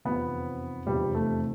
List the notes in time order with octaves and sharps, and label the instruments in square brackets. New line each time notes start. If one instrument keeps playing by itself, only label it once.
[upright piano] F1 E2 C3 F3 C4 [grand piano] B3
[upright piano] F1 E2 C3 F3 C4 [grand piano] G3
[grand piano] A3